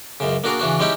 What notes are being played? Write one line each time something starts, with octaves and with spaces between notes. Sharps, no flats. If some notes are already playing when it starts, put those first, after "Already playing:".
C#2 F#2 C#3
A#3 D4 F#4 G#4 A#4
C#3 E3 D4 F#4
G3 G#3 C#4 D#4 E4 G4